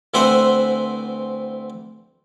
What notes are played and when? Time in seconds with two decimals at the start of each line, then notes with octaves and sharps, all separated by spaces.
0.14 D2 E3 C4 C5 E5 F#5